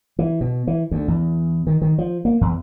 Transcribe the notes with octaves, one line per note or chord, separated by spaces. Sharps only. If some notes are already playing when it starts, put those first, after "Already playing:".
E3
B2
E3
D2
E2
D#3
D#3
F3
A#3
E2